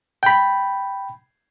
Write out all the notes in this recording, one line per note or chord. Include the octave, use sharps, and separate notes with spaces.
G5 B5